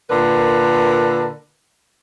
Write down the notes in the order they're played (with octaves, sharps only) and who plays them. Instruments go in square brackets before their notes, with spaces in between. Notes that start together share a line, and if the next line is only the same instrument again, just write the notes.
[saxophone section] A#2 D3 A#4 B4